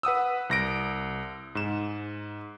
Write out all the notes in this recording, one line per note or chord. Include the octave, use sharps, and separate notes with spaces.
B4 F#5 D#6 E6
C2 A#6 D7
G#2 E7